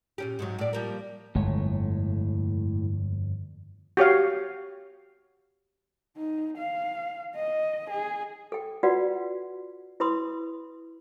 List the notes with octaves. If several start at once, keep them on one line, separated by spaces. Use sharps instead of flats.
A#2 C#4 G4
G#2 C3 F#3
A2 D5
F3 G3 A#3
G1 F2 A2 G#3 C#5
F#4 G4 C#5 F5
D#4
F5
D#5
G#4
A4 G5
F4 F#4 B4 D5 F#5
E4 B4 B5 C6 D#6